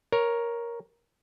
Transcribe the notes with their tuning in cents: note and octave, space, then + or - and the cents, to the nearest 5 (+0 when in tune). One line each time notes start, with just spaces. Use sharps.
A#4 +10 C#5 +0